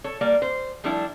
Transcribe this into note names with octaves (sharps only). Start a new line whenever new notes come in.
A4 C#5
G3 A#3 D5
C5
F3 G3 A3 D4 E4